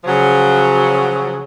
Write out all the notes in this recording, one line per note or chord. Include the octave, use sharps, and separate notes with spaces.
C#3 F3 F#3